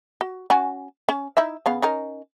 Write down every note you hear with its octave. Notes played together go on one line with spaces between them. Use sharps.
F#4
C#4 F#4 G#5
C#4
D#4 E4 E5
C#3 B3 F5
C#4 D#4 A#4